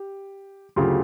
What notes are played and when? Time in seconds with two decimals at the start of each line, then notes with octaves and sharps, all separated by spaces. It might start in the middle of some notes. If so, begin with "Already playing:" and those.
Already playing: G4
0.76 D2 C#3 F#3 F4 G4